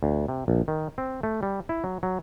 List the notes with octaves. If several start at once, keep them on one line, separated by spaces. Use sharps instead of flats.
D2
C3
A#1
D#3
C4
A3
G3
E4
F#3
F#3